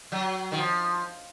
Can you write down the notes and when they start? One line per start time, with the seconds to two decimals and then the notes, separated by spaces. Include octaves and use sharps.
0.12 F#3
0.52 D#3
0.57 F3